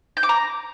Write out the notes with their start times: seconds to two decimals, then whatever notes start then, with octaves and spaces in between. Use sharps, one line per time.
0.17 G6
0.23 D6
0.29 A#5